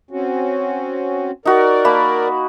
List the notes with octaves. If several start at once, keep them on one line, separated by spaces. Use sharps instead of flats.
C4 C#4 F#4
D#4 F#4 A#4 D5
A#3 A5 B5